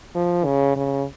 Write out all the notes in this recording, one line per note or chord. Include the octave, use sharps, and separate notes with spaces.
F3
C#3
C#3